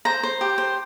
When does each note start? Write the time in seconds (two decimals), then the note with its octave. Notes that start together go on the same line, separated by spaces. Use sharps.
0.05 C5 A#5
0.23 C5
0.41 G4
0.58 C5